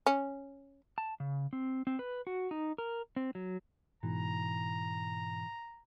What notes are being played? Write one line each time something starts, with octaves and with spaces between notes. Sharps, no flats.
C#4
A5
C#3
C4
C4
B4
F#4
D#4
A#4
C4
F#3
G#2 B2 E3 A#5